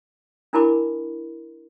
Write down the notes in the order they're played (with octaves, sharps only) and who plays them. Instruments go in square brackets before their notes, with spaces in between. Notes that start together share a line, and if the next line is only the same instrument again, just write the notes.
[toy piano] D4 E4 A#4 A5 B5 D6